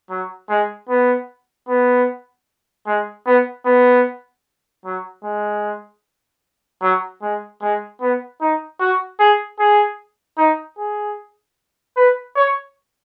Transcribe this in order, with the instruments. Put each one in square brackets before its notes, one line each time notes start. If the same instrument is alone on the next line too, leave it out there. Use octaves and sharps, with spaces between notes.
[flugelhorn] F#3
G#3
B3
B3
G#3
B3
B3
F#3
G#3
F#3
G#3
G#3
B3
D#4
F#4
G#4
G#4
D#4
G#4
B4
C#5